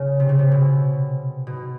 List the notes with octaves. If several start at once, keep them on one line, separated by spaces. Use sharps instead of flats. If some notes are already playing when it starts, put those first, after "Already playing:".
Already playing: C#3
C3
C#3
C3
B2
B2